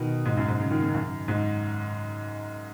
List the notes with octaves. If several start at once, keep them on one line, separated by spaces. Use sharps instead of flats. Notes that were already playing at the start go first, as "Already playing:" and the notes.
Already playing: B2 D#3
G#2
F#2
G#2
C#3
D#3
C#3
F#2
G#2